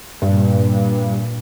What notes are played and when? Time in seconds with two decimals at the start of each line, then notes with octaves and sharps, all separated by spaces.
0.22 G2 A#2